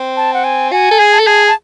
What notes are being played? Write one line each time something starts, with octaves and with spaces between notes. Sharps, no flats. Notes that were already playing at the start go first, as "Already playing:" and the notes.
Already playing: C4
A5
F#5
G#5
F#4 G#5
A4
G#4
A5
A4
G#4
A5